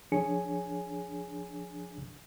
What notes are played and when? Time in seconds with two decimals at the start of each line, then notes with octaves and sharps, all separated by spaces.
0.12 F3 D4 G#4 C#5 G#5 C#7